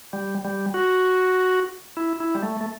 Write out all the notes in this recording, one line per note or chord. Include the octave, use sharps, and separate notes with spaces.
G3
G3
F#4
E4
E4
G3
A3
A3